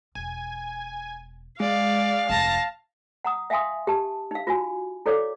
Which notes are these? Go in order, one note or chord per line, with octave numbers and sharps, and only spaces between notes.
E1 G#5
G#3 D5 F5
F1 D#2 A5 A#6
F#5 A#5 D#6
E5 F5 G5 G#5 C6 D#6
G4 A5
D#4 F5
F4 F#4 G#5
E4 A4 C#5 D5 F5 D6